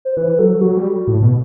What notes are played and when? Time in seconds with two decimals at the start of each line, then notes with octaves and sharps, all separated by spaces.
0.05 C5
0.17 E3 B4
0.39 F#3 A4
0.61 F#3 F#4
0.77 G3
1.07 A2
1.22 B2